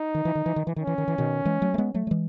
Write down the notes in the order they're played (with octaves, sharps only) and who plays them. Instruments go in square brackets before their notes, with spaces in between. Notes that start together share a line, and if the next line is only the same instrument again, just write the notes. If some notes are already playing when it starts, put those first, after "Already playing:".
Already playing: [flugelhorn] D#4
[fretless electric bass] D#3
E3
D#3
E3
D#3
E3
[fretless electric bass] D#3 [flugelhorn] C#4
[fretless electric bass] E3
D#3
E3
B2 D#3
E3 G#3
F#3 A3
A3
G#3 B3
F#3 A3
F#3
E3 G#3